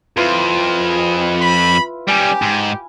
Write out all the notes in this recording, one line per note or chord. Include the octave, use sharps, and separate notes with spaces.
F2 E4 F4 B4
G#4
B5
G3 C#4 G4 G#5
G#2